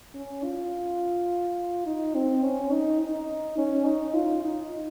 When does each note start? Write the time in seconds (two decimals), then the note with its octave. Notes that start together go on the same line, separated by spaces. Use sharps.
0.15 C#4
0.44 F4
1.86 D#4
2.15 C4
2.44 C#4
2.72 D#4
3.01 D#4
3.58 C#4
3.85 D#4
4.15 F4
4.43 D#4